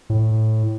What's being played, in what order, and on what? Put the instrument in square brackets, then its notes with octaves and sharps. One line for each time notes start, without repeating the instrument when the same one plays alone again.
[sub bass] A2